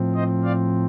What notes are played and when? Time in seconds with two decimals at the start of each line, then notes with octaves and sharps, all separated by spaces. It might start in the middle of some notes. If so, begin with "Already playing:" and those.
Already playing: A2 F3 C4
0.15 C5 D#5
0.44 D5 F5